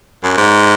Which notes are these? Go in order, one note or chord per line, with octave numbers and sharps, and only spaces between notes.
F#2
G#2